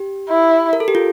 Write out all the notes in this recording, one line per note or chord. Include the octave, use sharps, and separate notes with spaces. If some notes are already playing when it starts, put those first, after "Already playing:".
Already playing: G4
E4
A#4
A4
G4
F4